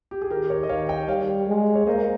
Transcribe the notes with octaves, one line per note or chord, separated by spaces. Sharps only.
G4
G#4
D#3 G4 A#4
A#4 C#5
D#5
D#3 C#5 F5
D#5 G5
G3 C#5 F5
G#3
C#5
A#3 C5 D#5